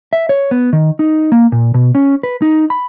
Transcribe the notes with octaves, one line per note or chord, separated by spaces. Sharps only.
E5
C#5
B3
D#3
D#4
A#3
A#2
B2
C#4
B4
D#4
B5